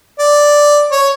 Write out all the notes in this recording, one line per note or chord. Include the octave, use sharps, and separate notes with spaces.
D5
C#5